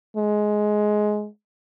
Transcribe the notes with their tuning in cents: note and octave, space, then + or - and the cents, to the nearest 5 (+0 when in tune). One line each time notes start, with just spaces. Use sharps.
G#3 +15